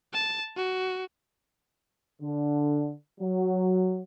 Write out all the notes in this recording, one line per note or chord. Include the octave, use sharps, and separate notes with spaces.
A5
F#4
D3
F#3